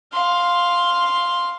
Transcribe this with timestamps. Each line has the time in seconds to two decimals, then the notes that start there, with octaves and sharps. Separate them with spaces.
0.13 F5 C6